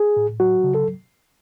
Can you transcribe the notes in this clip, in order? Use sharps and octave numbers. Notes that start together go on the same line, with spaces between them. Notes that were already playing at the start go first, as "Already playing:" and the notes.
Already playing: G#4
A2
F#3 F#4
C#3
A4